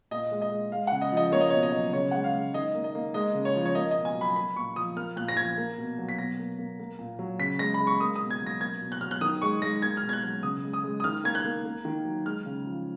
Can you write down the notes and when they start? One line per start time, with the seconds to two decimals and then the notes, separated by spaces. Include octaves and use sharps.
0.11 A#2 D#5
0.31 G#3
0.42 D#5
0.51 G#3
0.72 G#3 F5
0.87 C#3 F#5
1.01 D#5
1.12 F3 D#5
1.32 A#3 C#5
1.41 D#5
1.50 B2 C#5
1.63 D#5
1.72 F#3
1.93 C#3 C#5
2.11 G#3 F#5
2.24 F5
2.34 G#3
2.54 D#3 D#5
2.75 A#3
2.84 D#5
2.95 A#3
3.14 G#3 D#5
3.34 C#3
3.45 C#5
3.56 F3
3.65 C#5
3.75 A#3 D#5
3.91 D#5
3.96 B2
4.05 G#5
4.15 F#3
4.21 B5
4.36 A#3 B5
4.56 A#2 C#6
4.76 F3 D#6
4.96 A#3 F6
5.16 A#2 F#6
5.28 A#6
5.37 F3 G#6
5.57 A#3
5.78 B2
5.99 F#3
6.09 B6
6.18 B2 A#6
6.39 A#3
6.59 A#3
6.80 A#3
6.99 A#2
7.19 F#3
7.39 C#3 B6
7.59 G#3 A#6
7.74 B5
7.80 G#3
7.87 C#6
8.00 A#3 D#6
8.16 D#6
8.21 B2
8.30 G#6
8.41 F#3
8.47 A#6
8.61 A#3 G#6
8.81 B2
8.92 F#6
9.01 F#3 F6
9.11 F#6
9.21 D#3 D#6
9.42 G#3 C#6
9.62 G#3 A#6
9.82 A#3 G#6
9.97 F6
10.03 B2
10.09 G#6
10.13 F#6
10.24 F#3
10.43 C#3 D#6
10.64 G#3
10.73 D#6
10.84 G#3
11.00 D#6
11.04 D#3 F6
11.24 A#3 G#6
11.35 F#6
11.45 A#3
11.65 A#3
11.85 D#3
12.05 F#3
12.25 G#3 F6
12.46 C#3
12.66 F3